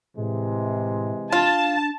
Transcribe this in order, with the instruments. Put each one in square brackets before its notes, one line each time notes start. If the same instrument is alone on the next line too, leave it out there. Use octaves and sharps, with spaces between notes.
[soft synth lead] A2 [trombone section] C3 E3 G#3
[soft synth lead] D4 [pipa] F4 [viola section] A5